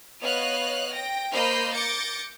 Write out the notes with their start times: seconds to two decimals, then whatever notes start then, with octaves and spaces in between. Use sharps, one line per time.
0.21 B3 C#5 D#5 F5 F6 F#6
0.91 G5 A#6
1.32 A#3 C5 D#5 B5 F6 G6
1.74 D6 G6 A6 A#6 C#7